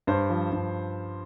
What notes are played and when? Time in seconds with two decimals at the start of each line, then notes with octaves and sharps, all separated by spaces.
0.07 G2 C5
0.30 F3
0.52 G2